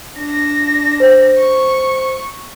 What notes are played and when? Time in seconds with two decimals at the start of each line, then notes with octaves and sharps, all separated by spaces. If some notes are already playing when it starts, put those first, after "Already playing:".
0.18 D4 A#6
1.00 C5
1.39 C#6